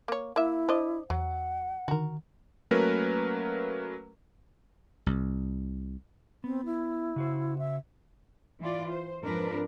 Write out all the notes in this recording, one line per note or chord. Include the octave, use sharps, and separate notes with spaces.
A#3 C#5
A#3 E4 E5
D4 C5 D#5
E2 F#3 F#5
D3 D#3 F#4 A#4
F#3 A3 A#3 C#4 A#4 B4
C2
B3 C4
E4
C#3 F#4 C5
E5
E3 F4 D5
C5
F2 G#2 F3 D4 A#4 B4